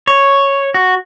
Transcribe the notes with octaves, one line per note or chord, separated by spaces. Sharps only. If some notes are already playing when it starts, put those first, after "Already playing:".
C#5
F#4